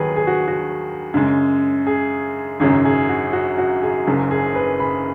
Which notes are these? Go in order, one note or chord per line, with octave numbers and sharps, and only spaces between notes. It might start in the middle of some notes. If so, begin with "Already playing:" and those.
Already playing: D#2 D#3 F#3 G#4 B4
G#4
F#4
F#4
F#2 C#3 G#3
G#4
G#1 F#2 C#3 F#3 G#4
G#4
F#4
F#4
F#4
G#4
F#1 F#2 C#3 F#3
G#4
B4
B5